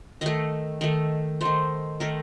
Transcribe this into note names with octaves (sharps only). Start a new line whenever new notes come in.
D#3 A3 D#5
D#3 A3
D#3 A3 C5
D#3 A3 A#4